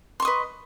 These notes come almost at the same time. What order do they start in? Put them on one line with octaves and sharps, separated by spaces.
C6 C#6 D#5 B4